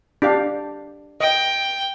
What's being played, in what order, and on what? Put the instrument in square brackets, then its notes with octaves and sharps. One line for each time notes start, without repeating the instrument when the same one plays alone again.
[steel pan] D4 G4 F5
[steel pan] D#5 [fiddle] G5